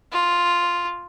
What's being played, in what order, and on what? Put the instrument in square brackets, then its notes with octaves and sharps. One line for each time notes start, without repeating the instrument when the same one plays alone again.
[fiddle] F4